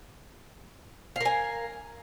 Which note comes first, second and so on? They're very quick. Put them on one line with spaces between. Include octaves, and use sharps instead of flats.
F5 A#4 G#5